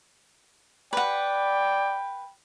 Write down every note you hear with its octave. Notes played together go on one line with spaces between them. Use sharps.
B4 D5 F#5 G5